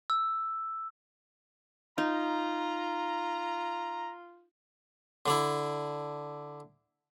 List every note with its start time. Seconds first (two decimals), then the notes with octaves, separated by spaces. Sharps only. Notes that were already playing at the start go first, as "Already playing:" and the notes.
0.10 E6
1.98 D#4 F4 A#5
5.26 D3 D4 E4